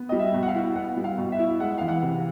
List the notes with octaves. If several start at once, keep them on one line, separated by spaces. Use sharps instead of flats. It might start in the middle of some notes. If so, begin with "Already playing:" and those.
Already playing: B3
G3 D#5
E5
B2
F#5
F5
E4
B3 F#5
G3
F5
B2
E5
E4
G#3 F#5
E3 F5
F#5
C3